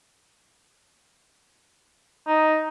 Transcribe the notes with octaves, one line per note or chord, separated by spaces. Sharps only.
D#4